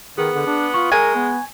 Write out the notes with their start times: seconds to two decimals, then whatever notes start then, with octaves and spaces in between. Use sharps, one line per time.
0.18 D#3 B3 G#4
0.34 D3
0.47 D4
0.74 F4 C#6
0.92 G#3 A#4 G#5
1.15 B3